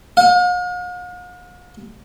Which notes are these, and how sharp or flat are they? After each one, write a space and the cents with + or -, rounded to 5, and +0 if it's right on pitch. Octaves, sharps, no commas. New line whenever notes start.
F5 +45